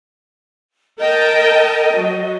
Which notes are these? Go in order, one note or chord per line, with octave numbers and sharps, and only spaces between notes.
A#4 D#5 G5 A5
F#3